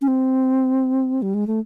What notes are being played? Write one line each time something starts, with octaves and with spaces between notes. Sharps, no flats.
C#4
C4
G3
G#3
A3